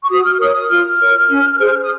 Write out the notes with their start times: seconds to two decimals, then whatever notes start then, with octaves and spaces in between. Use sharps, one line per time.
0.04 C#6
0.10 F#4 D#6
0.25 F6
0.40 A#4 C#5 D#6
0.55 D#6
0.69 F4 F6
1.00 A#4 C#5
1.29 C#4
1.59 G#4 C5
1.82 D#6